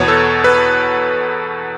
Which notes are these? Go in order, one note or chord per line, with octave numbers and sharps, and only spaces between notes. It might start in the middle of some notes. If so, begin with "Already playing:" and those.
Already playing: E2 B2 B3 C#5
A4
B4